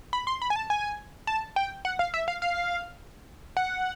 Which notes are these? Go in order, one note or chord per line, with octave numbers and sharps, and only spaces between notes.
B5
C6
B5
G#5
A5
G#5
A5
G5
F#5
F5
E5
F5
F5
F#5